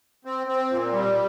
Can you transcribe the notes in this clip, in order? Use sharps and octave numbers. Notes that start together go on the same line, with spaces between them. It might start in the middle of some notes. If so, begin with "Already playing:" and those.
C4
C4
A#2
G3